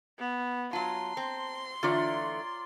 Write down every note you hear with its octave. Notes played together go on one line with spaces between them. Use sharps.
B3
F#3 F4 A5 A#5 C6
C4
D3 E3 A3 F4 C#5 D5 A#5